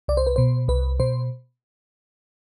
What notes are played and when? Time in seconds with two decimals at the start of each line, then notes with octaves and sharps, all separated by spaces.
0.08 C2 D5
0.17 C5
0.27 B4
0.36 B2 C5
0.68 C2 B4
1.00 B2 C5